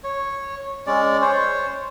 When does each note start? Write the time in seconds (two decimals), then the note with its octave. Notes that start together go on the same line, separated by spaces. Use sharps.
0.04 C#5
0.87 G#3 C#4 D5
1.22 C5 C#5